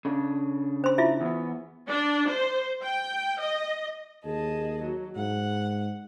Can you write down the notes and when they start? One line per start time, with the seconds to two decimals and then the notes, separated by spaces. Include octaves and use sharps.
0.05 C#3 D4
0.84 C5 C6
0.98 E4 F4 E5
1.21 E2 B3
1.88 D4
2.29 C5
2.84 G5
3.40 D#5
4.24 D#2 G#4 D#5 A5
4.82 F#3
5.16 G#2 F#5